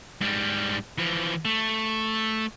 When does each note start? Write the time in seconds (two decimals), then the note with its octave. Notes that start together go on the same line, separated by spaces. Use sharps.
0.21 G#2 G3
0.98 E3 F3
1.45 A3